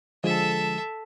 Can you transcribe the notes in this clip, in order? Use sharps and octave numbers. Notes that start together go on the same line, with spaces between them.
D3 F3 G#3 A4 E5